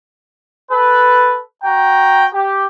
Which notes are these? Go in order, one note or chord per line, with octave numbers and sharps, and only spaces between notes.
A4 B4
F#4 G5 A#5
G4